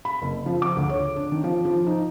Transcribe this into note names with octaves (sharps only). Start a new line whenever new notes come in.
B5
F#1
F3
D6
D2
C#5
D4
D#3
F3
F3
D#4